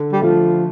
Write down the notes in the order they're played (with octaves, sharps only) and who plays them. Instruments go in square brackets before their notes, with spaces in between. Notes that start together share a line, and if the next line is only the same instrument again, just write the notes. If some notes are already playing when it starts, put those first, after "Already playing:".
Already playing: [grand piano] D3
[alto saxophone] G3
[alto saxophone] F3 [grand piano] A3